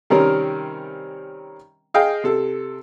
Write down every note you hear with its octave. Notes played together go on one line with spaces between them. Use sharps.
C3 D#3 G3 C4 C#4 A#4
G#4 D#5 F5 G5
C3 A4